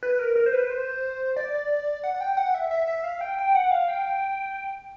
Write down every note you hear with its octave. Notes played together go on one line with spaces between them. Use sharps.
B4
A#4
A#4
C5
B4
C5
D5
F#5
F#5
G5
F#5
E5
E5
E5
F5
G5
G5
F#5
F5
G5